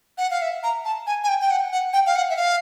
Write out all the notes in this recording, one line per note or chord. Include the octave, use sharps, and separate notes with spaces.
F#5
F5
E5
A#5
A5
G#5
G#5
G5
G5
F#5
F#5
G5
F5
F#5
E5
F5